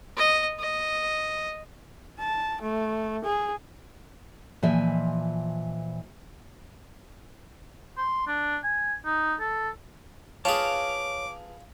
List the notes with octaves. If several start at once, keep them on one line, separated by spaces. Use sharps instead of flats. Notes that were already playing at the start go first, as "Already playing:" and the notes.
D#5
D#5
A5
A3
G#4
A#2 E3 F3 D#5 E5 G#5
C6
D4
G#5
D#4
A4
F4 G#4 B4 C#5 F5 A5 D6